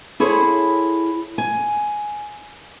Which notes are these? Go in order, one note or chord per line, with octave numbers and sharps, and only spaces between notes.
E4 G#4 A4 C5 C#5
G#5